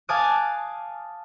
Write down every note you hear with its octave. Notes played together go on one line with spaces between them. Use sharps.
F5 G#5 A5 D6 D#6 F#6